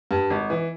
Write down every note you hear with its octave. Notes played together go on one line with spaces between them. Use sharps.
G2
G#1
E3